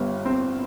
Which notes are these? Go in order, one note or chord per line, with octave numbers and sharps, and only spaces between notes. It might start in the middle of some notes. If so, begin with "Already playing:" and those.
Already playing: G1 G2 B3
C4